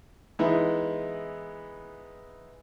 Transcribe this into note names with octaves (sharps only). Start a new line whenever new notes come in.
E3 G#3 B3 D#4 E4 E5